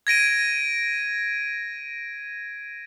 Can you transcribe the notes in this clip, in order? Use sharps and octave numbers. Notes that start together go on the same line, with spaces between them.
G#6 A#6 D7 D#7